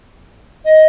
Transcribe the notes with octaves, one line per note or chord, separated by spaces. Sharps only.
D#5